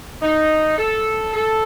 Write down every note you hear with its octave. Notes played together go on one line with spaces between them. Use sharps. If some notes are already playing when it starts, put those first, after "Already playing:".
D#4
A4
A4